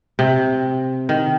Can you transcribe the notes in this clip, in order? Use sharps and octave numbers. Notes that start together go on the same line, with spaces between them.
C3
D#3